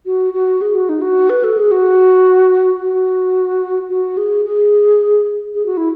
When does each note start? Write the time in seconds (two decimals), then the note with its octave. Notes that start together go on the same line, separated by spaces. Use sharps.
0.06 F#4
0.34 F#4
0.61 G#4
0.75 F#4
0.89 D#4
1.02 F#4
1.30 B4
1.44 A4
1.57 G#4
1.71 F#4
2.81 F#4
3.89 F#4
4.17 G#4
4.45 G#4
5.54 G#4
5.66 F#4
5.77 E4